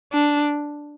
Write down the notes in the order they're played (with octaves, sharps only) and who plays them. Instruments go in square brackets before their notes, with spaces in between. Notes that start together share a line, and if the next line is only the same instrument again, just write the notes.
[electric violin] D4